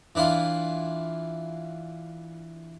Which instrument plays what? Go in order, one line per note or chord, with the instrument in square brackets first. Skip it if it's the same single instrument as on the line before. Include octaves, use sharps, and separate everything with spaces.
[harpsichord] E3 D4 E4 F4